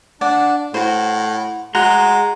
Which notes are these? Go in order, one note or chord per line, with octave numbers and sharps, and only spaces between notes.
D4 D5 F#5
A2 F#4 C5
G#3 F#4 A#5 C6 F#6